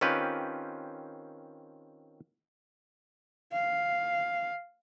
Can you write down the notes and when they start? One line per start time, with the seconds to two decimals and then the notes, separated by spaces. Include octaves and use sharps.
0.01 D#3 C4 C#4 F4 G4 B4
3.53 F5